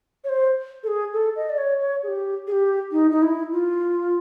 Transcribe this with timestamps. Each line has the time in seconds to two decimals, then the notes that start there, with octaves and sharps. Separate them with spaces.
0.24 C#5
0.29 C5
0.83 A4
0.88 G#4
1.13 A4
1.36 D#5
1.49 D5
1.58 C#5
1.80 C#5
2.03 G#4
2.08 G4
2.47 G#4
2.52 G4
2.92 D#4
3.11 D#4
3.22 E4
3.52 F4